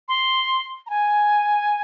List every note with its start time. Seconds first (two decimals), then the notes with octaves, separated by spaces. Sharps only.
0.08 C6
0.86 A#5
0.90 G#5